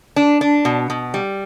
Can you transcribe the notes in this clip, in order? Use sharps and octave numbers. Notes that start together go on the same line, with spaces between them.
D4
D4
B2
B2
G3